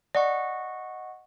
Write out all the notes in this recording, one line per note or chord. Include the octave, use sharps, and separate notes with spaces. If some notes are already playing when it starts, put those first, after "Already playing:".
D5 D#5 F#5 C#6